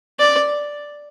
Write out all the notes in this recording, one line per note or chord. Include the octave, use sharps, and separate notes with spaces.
D5